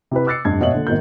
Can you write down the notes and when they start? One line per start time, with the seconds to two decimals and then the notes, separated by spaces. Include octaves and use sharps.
0.11 C3 E4 G4 B4
0.27 D6 E6 F#6 A6 C7 C#7
0.45 F1 G2 G#6
0.60 G#1 B2 C#5 E5 F#7
0.73 A#1 D3
0.87 G#1 D#3 A#3 G6